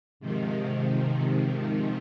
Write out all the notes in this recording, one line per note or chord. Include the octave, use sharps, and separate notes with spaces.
G#2 C3 D#3 F3